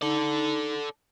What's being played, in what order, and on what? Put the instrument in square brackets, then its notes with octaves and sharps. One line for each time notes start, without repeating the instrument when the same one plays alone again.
[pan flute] D#4 [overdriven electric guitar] A4 D5